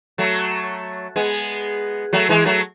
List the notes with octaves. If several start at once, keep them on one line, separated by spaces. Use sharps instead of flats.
F#3 A3
G#3 B3
F#3 A3
E3 G#3
F#3 A3